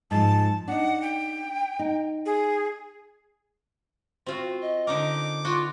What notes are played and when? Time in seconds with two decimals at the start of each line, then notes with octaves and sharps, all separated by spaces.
0.11 G#2 F3 A5
0.68 D4 D#4 F#5
1.02 G5
1.79 D#4
2.26 G#4
4.26 C4 F4 F#4
4.62 D#5
4.87 D3 D#4 A#4 D6
5.45 F4 F#4